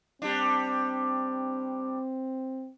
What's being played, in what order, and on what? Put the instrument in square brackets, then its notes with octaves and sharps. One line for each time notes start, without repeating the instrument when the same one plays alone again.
[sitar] G3 D4 [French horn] C4